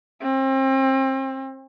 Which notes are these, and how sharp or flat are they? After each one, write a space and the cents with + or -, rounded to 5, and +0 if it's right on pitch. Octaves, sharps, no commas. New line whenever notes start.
C4 +35